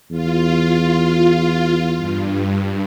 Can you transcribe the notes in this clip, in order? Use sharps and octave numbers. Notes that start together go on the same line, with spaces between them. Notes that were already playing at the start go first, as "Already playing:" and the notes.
E2 F4
G2